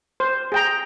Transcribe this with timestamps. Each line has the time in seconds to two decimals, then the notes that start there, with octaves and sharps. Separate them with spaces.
0.20 C5
0.52 G#4 G5 A#5